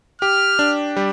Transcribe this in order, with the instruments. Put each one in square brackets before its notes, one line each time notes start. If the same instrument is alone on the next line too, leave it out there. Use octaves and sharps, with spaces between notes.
[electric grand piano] G4 [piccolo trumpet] F6
[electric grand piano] D4
G3